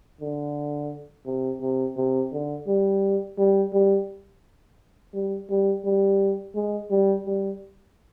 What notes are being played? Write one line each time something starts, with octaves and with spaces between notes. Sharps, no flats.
D3
C3
C3
C3
D3
G3
G3
G3
G3
G3
G3
G#3
G3
G3